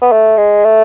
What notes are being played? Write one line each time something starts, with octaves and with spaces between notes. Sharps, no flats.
B3
A3
G#3
A3